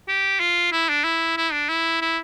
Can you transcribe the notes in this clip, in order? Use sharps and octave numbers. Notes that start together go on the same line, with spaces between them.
G4
F4
E4
D4
E4
E4
D4
E4
E4